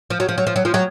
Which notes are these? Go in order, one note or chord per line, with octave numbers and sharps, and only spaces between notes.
F3
F#3
F3
F#3
F3
F#3
F3
F#3